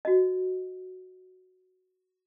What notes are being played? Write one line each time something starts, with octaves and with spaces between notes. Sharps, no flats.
F#4 D#5